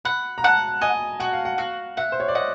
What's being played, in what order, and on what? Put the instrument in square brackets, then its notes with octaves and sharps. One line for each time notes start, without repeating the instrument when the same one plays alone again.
[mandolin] F#5 [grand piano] B5
[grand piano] A#5
[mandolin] F#5 [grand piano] A5
[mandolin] D#5 [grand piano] G#5
[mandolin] F#4 [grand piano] F#5
[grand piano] F5
F#5
[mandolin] F#4 [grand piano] F5
[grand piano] E5 [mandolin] F#5
[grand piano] C5
C#5
D5
[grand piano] D#5 [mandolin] F#5